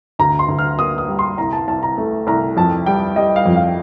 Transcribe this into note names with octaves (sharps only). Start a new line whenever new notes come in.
D2 A#5
C6
D2
F6
A#3 D#6
D#6
G3
C6
C2 A#5
A5
C2 A5
A#5
A3
C2 A#5
F2 A5
G3 G5
G3 D#5
F5
F2
F5